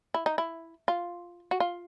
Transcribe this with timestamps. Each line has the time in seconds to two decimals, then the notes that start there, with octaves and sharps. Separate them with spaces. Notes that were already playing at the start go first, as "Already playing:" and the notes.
0.14 E4
0.26 D#4
0.38 E4
0.88 F4
1.51 F#4
1.60 F4